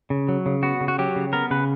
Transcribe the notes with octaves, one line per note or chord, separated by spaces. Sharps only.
C#3
F#3
C#3
B3 F#4
C#3
F#4
F#3 G4
C#3
B3 A#4
C#3 B4